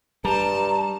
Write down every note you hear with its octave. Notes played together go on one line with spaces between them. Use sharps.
G2 G3 A5 A#5